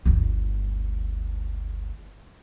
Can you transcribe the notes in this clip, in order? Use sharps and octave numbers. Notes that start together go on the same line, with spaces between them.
G1 D2